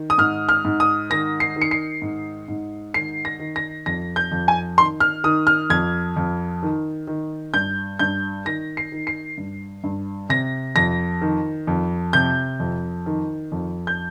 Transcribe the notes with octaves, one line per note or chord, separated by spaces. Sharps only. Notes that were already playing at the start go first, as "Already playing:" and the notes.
Already playing: D#3
D#6
G#2 F6
F6
G#2
D#6
D#3 A#6
C7
D#3
C#7
C7
G#2
G#2
D#3 C7
A#6
D#3
A#6
F2 A#6
G6
F2
G#5
D#3 C6
F6
D#3 D#6
F6
F2 G#6
F2
D#3
D#3
G2 G6
G2 G6
D#3 A#6
C7
D#3
C7
G2
G2
C3 A#6
F2 A#6
D#3
F2
C3 G6
F2
D#3
F2
G6